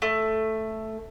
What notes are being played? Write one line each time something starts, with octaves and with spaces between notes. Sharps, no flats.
A3